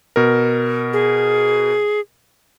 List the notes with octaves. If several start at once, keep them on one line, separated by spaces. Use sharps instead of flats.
B2 A#4
G#4